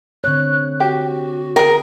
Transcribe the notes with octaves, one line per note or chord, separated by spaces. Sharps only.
D3 C4 C#5 F#6
F#4 G4
G#4 A#4 G5